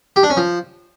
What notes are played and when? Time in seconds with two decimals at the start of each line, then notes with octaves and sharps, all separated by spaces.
0.16 G4
0.23 D4
0.30 C#4
0.37 F3